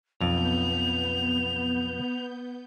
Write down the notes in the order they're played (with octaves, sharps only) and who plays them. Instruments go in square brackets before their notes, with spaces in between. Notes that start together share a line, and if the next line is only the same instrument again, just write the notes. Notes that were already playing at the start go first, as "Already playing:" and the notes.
[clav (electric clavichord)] B1 F2 [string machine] B3 G6 [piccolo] F7